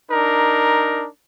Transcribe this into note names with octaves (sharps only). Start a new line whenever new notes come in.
D4 D#4 A#4